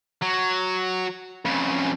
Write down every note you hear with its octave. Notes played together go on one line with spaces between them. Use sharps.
F#3
F2 C#3